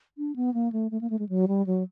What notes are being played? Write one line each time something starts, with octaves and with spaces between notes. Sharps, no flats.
D4
B3
A#3
A3
A3
A#3
A3
G#3
F#3
G3
F#3